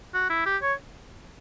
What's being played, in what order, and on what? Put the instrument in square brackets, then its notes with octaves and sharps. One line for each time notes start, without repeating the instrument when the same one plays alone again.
[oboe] F#4
E4
G4
C#5